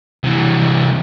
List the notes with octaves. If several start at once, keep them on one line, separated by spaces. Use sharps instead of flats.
C3 E3